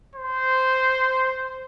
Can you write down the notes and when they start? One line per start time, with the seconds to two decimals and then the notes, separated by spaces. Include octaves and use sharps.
0.15 C5